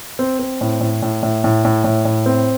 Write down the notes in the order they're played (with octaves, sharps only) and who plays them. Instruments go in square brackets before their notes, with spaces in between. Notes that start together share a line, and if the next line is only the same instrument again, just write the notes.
[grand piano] C4
C4
A2
A2
A2
A2
A2
A2
A2
A2
C4